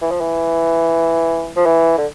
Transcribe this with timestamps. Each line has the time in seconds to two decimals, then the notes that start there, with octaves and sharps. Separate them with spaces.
0.02 E3
0.11 F3
0.21 E3
1.56 F3
1.66 E3
1.98 D3